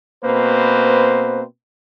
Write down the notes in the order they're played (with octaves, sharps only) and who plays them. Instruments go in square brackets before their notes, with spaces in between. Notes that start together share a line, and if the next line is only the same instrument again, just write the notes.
[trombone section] B2 A#3 C4 B4 C5